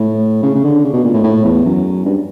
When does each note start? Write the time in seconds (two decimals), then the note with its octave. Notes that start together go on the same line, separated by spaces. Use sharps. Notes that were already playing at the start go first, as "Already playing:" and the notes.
Already playing: A2
0.43 C#3
0.55 C#3
0.64 D3
0.84 C#3
0.93 B2
1.04 A#2
1.14 A2
1.24 A2
1.44 E2
1.65 F#2
2.06 G2